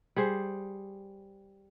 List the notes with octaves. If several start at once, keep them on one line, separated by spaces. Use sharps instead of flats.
G3 G#4 C5